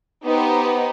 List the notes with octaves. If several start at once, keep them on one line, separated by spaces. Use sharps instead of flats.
B3 D#4 G4 C5